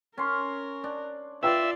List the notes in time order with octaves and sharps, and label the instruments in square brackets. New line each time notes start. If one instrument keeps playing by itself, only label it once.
[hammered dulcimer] C#4 C6 [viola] A#4
[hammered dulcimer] D4
[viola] F4 D5 [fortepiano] B4 G5 E6 [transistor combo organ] E5